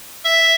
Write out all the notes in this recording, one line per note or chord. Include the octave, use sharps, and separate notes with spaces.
E5